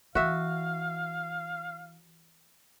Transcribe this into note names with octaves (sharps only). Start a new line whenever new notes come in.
E3 F#4 E5 F5